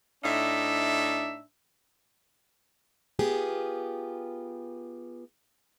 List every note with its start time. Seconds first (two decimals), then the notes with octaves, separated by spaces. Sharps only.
0.24 A2 D4 D#4 E5
3.19 B3 F4 G4 G#4